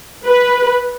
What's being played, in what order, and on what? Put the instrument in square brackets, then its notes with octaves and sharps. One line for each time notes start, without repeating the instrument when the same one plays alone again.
[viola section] B4